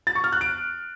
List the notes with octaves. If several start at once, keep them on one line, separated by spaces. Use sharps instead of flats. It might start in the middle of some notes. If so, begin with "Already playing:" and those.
A6
C#6
F6
F#6
D7